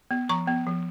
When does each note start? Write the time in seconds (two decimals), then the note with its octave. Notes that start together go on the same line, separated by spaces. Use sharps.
0.11 B3
0.29 F3 A#5 C#6
0.47 B3
0.67 F3